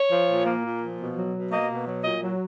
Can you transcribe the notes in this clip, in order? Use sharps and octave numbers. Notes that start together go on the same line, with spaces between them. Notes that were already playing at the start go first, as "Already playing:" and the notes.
Already playing: C#5
F3
A#2
A#3
A#2
F3
B2
F#3
B2
A#3 D#5
B2
F#3
A#2 D#5
F#3